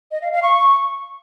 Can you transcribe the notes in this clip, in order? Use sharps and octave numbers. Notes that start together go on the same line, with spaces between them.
D#5
F5
F5
C#6